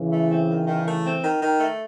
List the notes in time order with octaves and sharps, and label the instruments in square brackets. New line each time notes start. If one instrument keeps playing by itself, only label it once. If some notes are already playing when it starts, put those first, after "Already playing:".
Already playing: [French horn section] C#3 E3
[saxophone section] A3
C4
D#3
D#3
A3
C4
D#3
D#3
A3